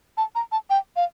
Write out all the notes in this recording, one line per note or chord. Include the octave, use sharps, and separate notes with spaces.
A5
A#5
A5
G5
F5